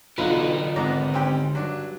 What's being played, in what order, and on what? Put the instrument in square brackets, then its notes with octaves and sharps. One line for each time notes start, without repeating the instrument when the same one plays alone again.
[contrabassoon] B1 [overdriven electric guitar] D3 D#4 [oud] F4 [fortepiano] B4 F#5
[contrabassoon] G#1 [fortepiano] G#2 B3 A#5 [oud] D5
[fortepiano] C4 C#4 G4
[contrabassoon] G2 [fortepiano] F#3 D4